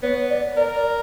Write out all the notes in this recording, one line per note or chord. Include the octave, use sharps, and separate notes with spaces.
B3 C#5
D5
A#4 D5
D5